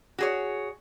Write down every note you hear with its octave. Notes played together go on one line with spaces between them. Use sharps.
F#4 G#4 C#5